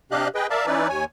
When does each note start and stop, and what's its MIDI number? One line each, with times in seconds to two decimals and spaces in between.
0.11 0.28 48
0.11 0.28 62
0.11 0.28 67
0.11 0.28 75
0.11 0.28 77
0.11 0.28 90
0.35 0.47 68
0.35 0.47 71
0.35 0.47 75
0.35 0.47 79
0.50 0.66 70
0.50 0.66 74
0.50 0.66 76
0.50 0.66 77
0.50 0.66 81
0.66 0.88 52
0.66 0.88 61
0.66 0.88 63
0.66 0.88 64
0.66 0.88 71
0.66 0.88 74
0.89 1.04 39
0.89 1.04 73
0.89 1.04 80